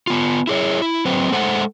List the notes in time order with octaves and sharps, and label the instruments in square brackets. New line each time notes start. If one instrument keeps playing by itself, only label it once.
[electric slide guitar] B3 F4
E4 G#4 C#5
E4
F#3 C4 B4 C5
G#3 A4 C5 F#5